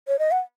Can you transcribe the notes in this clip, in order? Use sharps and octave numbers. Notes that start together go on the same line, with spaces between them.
C#5
D#5
F#5